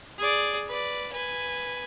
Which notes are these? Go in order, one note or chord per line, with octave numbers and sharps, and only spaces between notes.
G#4 D5
B4 D5
B4 G#5